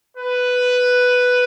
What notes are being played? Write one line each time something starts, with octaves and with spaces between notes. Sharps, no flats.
B4